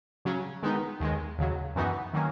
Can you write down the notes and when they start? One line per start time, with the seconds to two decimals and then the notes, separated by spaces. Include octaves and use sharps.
0.25 C#3 F#3 C#4
0.63 D#3 G#3 B3 D#4
1.00 D#2 D#3 G#3
1.38 D#2 C#3 F#3
1.76 F#2 E3 B3 D#4 F#4
2.13 D#3 F#3 A#3 C#4